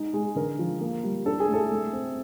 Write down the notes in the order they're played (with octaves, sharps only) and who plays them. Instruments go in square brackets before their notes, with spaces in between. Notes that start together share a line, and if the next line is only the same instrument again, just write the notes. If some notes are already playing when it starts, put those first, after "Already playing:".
Already playing: [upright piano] G#3 D#4
G#3
[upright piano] D3 [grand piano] A#4
[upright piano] F3
A#3
G3
[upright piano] D4 [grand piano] A4
[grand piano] G#4
[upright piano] A3 [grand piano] A4
[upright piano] A3
C4